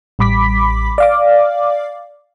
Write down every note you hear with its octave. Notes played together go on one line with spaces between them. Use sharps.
A1 G3 B5 D6 B6
D5 F5 D6